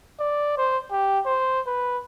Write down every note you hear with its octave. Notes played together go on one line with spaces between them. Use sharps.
D5
C5
G4
C5
B4